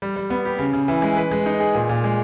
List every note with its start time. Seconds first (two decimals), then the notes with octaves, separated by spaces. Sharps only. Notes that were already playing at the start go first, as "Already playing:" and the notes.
0.02 G3
0.16 G3
0.30 B3
0.45 G4
0.59 C#3
0.73 C#3
0.88 E3
1.02 G#3
1.17 B4
1.31 G#3
1.46 D#4
1.60 G#4
1.75 A#2
1.89 A#2
2.04 G#3